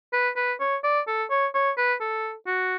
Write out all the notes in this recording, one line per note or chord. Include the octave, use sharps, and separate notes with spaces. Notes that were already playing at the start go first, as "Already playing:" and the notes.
B4
B4
C#5
D5
A4
C#5
C#5
B4
A4
F#4